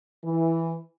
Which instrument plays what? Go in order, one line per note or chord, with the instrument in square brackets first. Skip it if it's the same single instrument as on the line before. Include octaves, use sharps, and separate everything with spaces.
[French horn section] E3